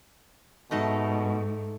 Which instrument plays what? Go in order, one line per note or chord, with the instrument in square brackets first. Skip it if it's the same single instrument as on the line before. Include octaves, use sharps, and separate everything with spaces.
[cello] G#2 [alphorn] B2 [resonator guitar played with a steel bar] A3 D#4 A4